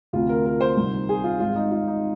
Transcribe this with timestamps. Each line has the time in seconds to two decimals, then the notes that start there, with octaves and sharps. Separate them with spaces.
0.13 D2 C3 F3 F4
0.29 A#4
0.45 A#4
0.61 C5
0.77 C2 C3 D#3
1.09 G#4
1.24 F4
1.40 G#1 G#2 F3 F4
1.55 D#4
1.71 F4
1.87 D#4